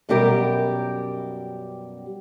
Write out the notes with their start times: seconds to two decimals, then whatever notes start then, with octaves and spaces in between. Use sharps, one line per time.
0.09 F#2 B2 G3 G4 A#4